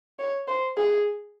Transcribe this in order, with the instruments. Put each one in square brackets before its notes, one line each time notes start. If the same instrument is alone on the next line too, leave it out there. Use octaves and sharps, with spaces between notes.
[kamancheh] C#5
C5
G#4